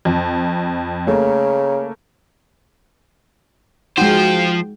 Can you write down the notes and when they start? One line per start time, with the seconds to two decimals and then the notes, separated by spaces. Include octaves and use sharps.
0.05 F2
1.07 C#3 A3 A#3
3.98 F3 G#3 D#4 F#4 C5 G5